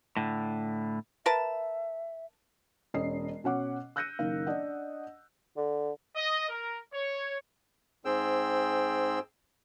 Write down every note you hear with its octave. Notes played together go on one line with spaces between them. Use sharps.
A2 D3
A#4 B4 E5 A5
E1 C#4 D#5 C7
B2 C#4 F#5 D6
E6 F#6 G6 A#6 C#7 D#7
F#1 D#3 A#3 F5
D4 D#5 F#5
D3
D#5
A#4
C#5
G#2 C4 G#4 G5 E6